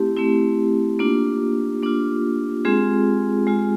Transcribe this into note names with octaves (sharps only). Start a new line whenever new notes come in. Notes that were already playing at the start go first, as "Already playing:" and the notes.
Already playing: A3 C4 E4 G4
A3 C4 E4
A#3 D4 F4
A#3 D4 F4
G#3 C4 F4 G#4
G#3 C4 F4